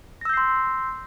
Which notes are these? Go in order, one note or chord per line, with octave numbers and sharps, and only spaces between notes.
C6 E6 G6 A#6 C7